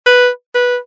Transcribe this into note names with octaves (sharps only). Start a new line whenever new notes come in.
B4
B4